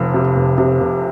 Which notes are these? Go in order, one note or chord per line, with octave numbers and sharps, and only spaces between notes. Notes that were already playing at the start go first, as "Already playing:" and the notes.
Already playing: F1 F2
C3
F1
C3
F1